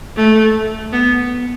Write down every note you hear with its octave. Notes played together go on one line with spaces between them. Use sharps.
A3
B3